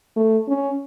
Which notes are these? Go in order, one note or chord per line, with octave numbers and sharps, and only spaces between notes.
A3
C#4